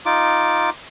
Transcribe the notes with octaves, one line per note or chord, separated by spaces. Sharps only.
D#4 F4 D6